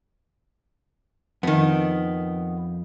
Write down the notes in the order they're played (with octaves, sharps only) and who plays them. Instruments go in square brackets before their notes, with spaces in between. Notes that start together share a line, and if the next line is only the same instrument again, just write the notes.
[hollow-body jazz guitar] F2 [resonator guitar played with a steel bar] D#3 B3